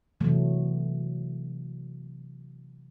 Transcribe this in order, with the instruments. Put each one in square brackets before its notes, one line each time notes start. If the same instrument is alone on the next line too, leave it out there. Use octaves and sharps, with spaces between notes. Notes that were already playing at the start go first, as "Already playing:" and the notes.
[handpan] C3 E3 F#3 A3